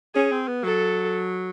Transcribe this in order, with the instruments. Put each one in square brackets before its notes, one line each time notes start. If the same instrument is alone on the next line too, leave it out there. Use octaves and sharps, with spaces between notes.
[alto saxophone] C#4 [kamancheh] G#4
[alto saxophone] C4
B3
[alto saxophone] F#3 [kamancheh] A4